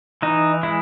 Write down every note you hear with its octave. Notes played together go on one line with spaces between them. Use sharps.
E3 D#4
G#3 E4